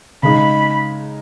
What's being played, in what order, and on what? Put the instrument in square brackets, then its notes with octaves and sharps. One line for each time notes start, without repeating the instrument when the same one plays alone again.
[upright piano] C#3 G#3 D#4 [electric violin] B5